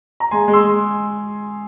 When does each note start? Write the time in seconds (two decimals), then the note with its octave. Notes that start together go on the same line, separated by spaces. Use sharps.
0.20 A#5
0.31 G#3 G#5 C6
0.48 G#3
0.53 C6 E6
0.64 G#3